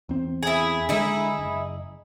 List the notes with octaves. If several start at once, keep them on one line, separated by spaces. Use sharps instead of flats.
E2 C4
E4 G#4
D3 G#3 D#4 E4 G#4
F#1